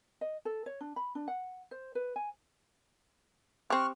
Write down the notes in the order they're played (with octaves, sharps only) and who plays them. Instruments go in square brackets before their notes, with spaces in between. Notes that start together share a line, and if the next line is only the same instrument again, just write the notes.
[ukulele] D#5
A4
C#5
D4
B5
D4
F#5
C5
B4
G#5
[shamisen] C4 G4 [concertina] C#6 F6 F#6